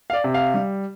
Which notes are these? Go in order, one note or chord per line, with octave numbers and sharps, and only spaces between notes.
F5
D5
C3
F5
G3